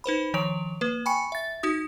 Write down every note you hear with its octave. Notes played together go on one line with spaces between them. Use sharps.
D#4 B4 C5 B5
D#3 F3 C#5 D7 F7
A#3 B4
G5 G#5 B5 C#6 C#7
E5 A6
D#4 F#4 D#6